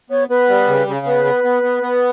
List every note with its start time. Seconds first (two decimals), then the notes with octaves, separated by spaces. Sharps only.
0.10 B3 C#5
0.30 B3 B4
0.49 G3
0.68 C#3
0.87 C#3
1.06 B3 B4
1.25 B3
1.44 B3
1.63 B3
1.83 B3